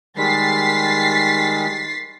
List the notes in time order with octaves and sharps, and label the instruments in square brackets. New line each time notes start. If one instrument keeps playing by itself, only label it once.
[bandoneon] D#3 G3 G#3 [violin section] A6 B6 C7